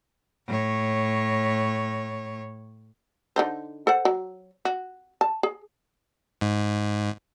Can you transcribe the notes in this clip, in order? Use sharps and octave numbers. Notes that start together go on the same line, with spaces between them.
A2 C#5
D3 D#4 C5
A4 C5 F#5
F#3
F#4
A5
G#4
G#2